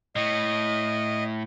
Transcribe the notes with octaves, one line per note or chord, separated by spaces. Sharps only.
A2 D#5